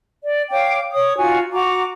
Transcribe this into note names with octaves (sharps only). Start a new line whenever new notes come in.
D5
C#5 F5 G5 D6
C#5 D#6
D#4 F4 F#4 G#5
F#4 A#5 D6